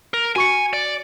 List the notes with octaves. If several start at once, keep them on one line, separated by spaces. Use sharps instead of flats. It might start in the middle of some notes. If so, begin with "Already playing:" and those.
A#4
F#4 G#5 C#6 C#7
D5